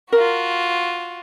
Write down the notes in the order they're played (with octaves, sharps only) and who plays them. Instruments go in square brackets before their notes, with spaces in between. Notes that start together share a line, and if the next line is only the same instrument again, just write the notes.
[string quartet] F4 F#4 [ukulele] A#4